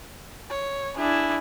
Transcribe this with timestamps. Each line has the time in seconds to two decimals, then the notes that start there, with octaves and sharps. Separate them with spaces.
0.50 C#5
0.97 D4 E4 G#4